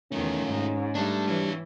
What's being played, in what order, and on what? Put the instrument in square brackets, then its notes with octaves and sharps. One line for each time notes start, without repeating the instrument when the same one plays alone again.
[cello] E2 D#3 [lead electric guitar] A3 F4 [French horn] C#4
[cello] G#2
[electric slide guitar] G3 D4 [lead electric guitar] A3
[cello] E3 [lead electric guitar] B3 C#5